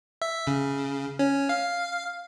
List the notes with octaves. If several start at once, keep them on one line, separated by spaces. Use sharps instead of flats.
E5
C#3
C#4
F5